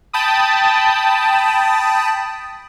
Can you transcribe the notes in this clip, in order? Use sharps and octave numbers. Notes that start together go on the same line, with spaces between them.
G5 A5 B5 D#6